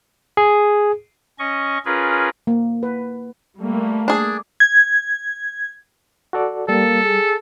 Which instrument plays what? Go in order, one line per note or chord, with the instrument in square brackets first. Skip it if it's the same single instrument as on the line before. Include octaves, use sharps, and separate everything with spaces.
[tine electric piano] G#4
[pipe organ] C#4 D#5 C#6
C#4 F4 G#4 A#4 B4
[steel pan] A#3
B4
[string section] G3 A3 A#3
[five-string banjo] D4 G#4
[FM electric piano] G#6
[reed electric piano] F#4 A4 D5
[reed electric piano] G3 [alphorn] A#3 [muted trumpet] A4
[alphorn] G#4